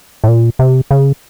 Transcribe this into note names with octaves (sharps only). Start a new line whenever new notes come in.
A2
A#2
C3
C#3